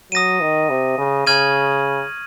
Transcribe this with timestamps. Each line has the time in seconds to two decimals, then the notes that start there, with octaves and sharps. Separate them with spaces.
0.12 F#3 D#6 A#6 D#7
0.41 D#3
0.70 C3
0.98 C#3
1.27 C#3 C#6 F6 G#6 D#7 F#7